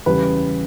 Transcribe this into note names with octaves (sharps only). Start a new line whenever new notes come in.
E2 C#3 G3 B4